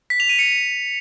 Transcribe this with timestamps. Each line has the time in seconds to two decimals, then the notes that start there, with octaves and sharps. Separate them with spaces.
0.10 B6
0.20 F7
0.29 D#7
0.39 C#7